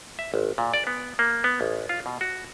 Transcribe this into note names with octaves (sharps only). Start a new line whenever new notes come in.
E5
G#1
A#2
D5
B3
A#3
B3
A1
F4
B2
F#4